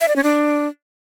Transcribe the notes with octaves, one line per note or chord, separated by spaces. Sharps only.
E5
D5
C#4
D4